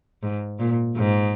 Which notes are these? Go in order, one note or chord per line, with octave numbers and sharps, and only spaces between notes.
G#2
A#2
G#2